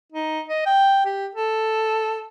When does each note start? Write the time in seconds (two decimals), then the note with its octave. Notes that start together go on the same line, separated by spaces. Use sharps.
0.12 D#4
0.49 D#5
0.66 G5
1.05 G4
1.35 A4